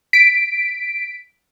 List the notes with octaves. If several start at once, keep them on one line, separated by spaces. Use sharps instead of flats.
B6 D7